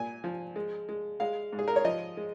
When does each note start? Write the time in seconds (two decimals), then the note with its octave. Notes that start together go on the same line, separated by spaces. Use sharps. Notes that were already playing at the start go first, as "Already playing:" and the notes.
Already playing: A#2 G#5
0.24 F3
0.56 G#3
0.89 G#3
1.20 G#3 F5
1.53 G#2
1.59 G#4
1.68 A#4
1.76 C#5
1.84 F3 D#5
2.17 G#3